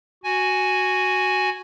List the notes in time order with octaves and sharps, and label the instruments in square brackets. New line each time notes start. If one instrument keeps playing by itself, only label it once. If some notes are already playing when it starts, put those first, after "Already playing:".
[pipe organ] F#4 G#5